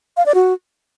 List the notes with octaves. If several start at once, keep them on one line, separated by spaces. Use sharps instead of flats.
F5
D5
F#4